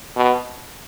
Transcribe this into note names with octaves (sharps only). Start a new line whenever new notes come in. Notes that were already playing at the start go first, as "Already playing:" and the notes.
B2